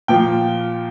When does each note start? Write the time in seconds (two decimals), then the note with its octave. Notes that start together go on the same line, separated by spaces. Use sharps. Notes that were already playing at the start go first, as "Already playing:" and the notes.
0.08 A#2 F3 G5